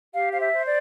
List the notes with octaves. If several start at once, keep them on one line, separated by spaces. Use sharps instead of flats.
G4 F5
C5 F5
E5
C5
D5